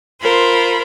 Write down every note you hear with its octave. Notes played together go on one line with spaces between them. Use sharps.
F4 A#4 C5 B5